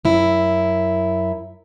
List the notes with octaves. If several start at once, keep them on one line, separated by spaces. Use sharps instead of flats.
F#2 E4